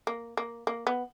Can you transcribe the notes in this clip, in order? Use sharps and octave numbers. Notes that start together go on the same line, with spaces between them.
A#3
A#3
A#3
B3